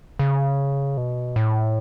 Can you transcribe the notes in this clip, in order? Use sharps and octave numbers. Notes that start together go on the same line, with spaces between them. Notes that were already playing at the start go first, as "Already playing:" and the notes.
C#3
B2
A2